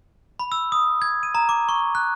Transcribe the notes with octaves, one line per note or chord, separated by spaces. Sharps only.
B5
E6
D#6
G#6
D#7
A#5
D6
C#6
F#6